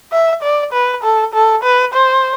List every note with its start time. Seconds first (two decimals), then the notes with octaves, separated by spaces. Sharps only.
0.12 E5
0.43 D5
0.73 B4
1.03 A4
1.34 A4
1.64 B4
1.94 C5